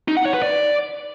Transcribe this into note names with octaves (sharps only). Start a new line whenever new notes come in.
D#4
F#5
C#5
B4
D5